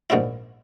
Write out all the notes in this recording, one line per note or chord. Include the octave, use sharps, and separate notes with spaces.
A#1 G#2 G3 C#4 E4